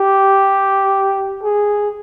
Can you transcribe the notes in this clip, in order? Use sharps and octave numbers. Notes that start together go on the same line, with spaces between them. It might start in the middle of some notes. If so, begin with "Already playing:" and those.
Already playing: G4
G#4